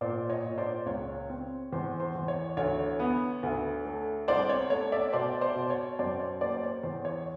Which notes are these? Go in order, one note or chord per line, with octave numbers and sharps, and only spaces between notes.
A#2 C5 D5
C#5 D#5
A#2
C5 D5
C#2 C#5
C4
E2 C5
C5
E2
C#5
D2 C#5
B3
D2
A3
C2 C5 D5
C#5
A3 C#5
D5 E5
B2 C5 D5
C5 D5
B2
C#5
F#2 C5 D5
C#5
A#3 C5 D5
C5
C#5
E2 C5
C#5